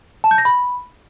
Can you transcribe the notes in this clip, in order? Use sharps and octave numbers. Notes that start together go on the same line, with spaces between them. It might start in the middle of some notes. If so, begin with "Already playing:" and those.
A5
G6
A#6
B5